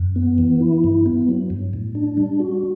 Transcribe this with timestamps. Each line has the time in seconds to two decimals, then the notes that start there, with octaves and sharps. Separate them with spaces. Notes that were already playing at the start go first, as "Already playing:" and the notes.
Already playing: F#2
0.16 B3
0.38 E3
0.60 E4
0.84 G2
1.06 B3
1.28 F#3
1.50 G2
1.73 A2
1.95 D4
2.17 G3
2.40 F#4